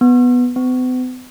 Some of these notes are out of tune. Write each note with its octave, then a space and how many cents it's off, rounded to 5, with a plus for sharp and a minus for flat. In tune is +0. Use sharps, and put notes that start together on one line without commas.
B3 +0
B3 +45